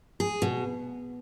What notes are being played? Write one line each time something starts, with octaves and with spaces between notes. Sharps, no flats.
G#4
B2